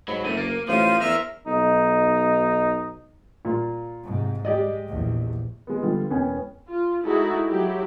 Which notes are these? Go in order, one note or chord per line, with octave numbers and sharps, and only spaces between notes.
G#2 F#3 B5
F#1 D3 A3 D#7
A#3
A1 F3 F4 C5 D#7
E2 A#4 C5 E5 E6 F6
B1 D#4
A#2 F4
G#2 C3
G#3 G4 D5 D#5
A#1 E2
G#3 B3
D3 F3 G3 B3 F4
E1 B3 C#4 G5 G#5
F4
G#3 D#4 E4 F#4 G#4 A4
F#3 E4 G4